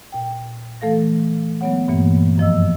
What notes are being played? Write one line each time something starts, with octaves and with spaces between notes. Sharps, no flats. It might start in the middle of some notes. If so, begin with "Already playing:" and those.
A#2 G5
E3 A3 A4 F5 A#6
F#3 G#3 B3 C#5 F#5
G2 A#2 E3 A3 A#3
F#2 F3 D#5 E6